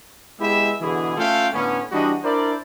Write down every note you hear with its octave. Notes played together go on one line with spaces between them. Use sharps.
G#3 B3 E4 G4 E5
B2 D3 E3 E4 G#4
A3 C#4 F4 A4 F5 G5
A2 D3 B3 C#4
E3 G3 D4 F#4 D#5
D4 E4 A#4 C5 D5